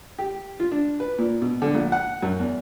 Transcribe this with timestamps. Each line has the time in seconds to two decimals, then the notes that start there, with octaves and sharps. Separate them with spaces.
0.19 G4
0.60 F4
0.72 D4
1.00 B4
1.18 A#2
1.42 B2
1.62 D3
1.74 A#1
1.92 F#5
2.22 F#2
2.40 E2